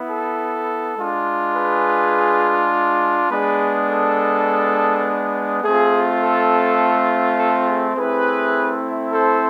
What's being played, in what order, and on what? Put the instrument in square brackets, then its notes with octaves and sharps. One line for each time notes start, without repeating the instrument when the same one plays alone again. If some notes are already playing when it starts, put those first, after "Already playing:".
Already playing: [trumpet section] B3 E4
A4
G#3 D4 F4
G#4 B4
G#3 B3 D4 G#4 B4
A4
A3 C4 F4 G#4
A4
A4
G#4
A3 C4 E4 G#4 B4
A4 C5